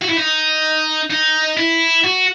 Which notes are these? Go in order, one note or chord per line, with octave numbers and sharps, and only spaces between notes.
F#4
E4
D#4
D#4
E4
F#4